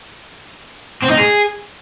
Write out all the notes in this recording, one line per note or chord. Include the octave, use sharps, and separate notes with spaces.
C4
D#4
G#4